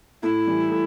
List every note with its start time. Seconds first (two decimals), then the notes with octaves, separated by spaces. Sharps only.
0.23 A2 E4
0.47 E3 G3
0.71 A2